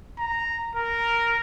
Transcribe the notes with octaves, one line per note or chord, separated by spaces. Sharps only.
A#5
A#4